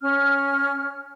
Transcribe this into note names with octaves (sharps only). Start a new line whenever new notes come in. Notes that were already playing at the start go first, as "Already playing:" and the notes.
C#4 F6